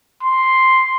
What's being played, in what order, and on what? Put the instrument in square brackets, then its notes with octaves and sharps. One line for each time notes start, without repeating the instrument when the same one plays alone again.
[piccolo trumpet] C6